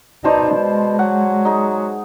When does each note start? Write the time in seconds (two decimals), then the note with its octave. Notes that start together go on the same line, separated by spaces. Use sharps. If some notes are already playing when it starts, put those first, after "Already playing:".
0.24 B2 D#4 C5 D5 A5
0.58 G#3
0.99 F#3 F#5
1.45 D#4 G#4